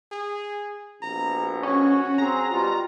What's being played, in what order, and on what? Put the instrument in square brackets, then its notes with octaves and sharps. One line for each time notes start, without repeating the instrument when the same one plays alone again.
[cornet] G#4
[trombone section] A#1 B2 [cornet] A#5
[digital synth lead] C#4 [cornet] F#4 [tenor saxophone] C#5
[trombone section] F#3 C#4 G#4 [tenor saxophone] C4 [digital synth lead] A#5
[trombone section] B2 G3 [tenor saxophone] F4 [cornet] F#4